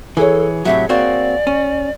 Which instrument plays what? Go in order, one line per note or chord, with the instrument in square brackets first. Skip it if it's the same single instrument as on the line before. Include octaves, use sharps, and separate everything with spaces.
[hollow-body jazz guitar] E3 [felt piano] G#4 C#5 [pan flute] A4
[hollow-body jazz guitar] A2 C3 F#3 [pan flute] E5
[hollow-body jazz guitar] A#3 C4 F#4 [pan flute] D5
[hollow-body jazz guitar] C#4